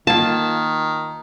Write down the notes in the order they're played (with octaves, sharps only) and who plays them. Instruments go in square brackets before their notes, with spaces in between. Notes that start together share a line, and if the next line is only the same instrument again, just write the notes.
[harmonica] D#3 [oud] A#3 F4 [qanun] A5